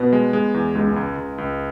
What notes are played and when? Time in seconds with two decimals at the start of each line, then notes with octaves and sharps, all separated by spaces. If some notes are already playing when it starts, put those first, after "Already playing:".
Already playing: B2 B3
0.13 G#3
0.33 G#3
0.54 E2
0.75 C#2 G#3
0.96 C#2
1.17 C#2
1.38 C#2